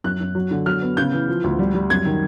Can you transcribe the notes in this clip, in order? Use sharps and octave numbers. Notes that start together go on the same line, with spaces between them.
F#2 F#6
F#2
F#3
D3
F#3 F6
B3
C#3 G6
E3
F3
D2
G3
G3
F#2 G#6
D#3